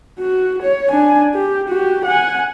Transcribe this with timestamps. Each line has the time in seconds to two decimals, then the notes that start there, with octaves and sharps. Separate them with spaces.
0.19 F#4
0.62 C#5
0.91 D4 G#5
1.35 G4
1.68 F#4 G4
2.05 F#5 G#5